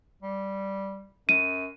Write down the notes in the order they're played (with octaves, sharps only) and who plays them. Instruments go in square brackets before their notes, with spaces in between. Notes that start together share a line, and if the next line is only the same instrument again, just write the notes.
[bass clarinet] G3
[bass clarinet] F#2 [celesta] D#7